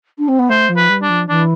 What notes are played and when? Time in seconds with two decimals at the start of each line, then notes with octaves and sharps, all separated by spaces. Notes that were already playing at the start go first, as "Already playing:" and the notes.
0.18 D4
0.28 C4
0.39 B3
0.49 A3 C5
0.69 F3
0.77 B4
0.89 G3
1.03 D4
1.10 F3
1.29 E3 D4